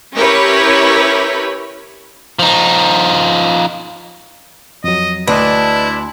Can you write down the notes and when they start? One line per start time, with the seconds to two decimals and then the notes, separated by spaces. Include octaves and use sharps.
0.16 C#4 E4 G4 A#4 B4 C#5
2.39 F3 D#4
4.84 F2 F#3 D#5
5.27 D2 D4 E4 B4 D5 D#5